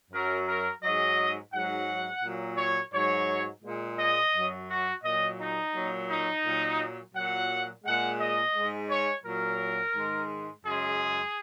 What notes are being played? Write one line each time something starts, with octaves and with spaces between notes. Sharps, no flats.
F#2 F#3 A#4
A#4
G#2 F#3 D#5
G#2 F#3 F#5
A#2 F#3
C#5
G#2 F#3 C#5
A#2 G#3
D#5
F#2 F#3
F#4
A#2 F#3 D#5
D#4
A#2 F#3
D#4
A#2 F#3
A#2 F#3 F#5
A#2 G#3 F#5
D#5
G#2 G#3
C#5
A#2 F#3 A#4
G#2 D#3 G#3
F#2 C#3 G#3 G#4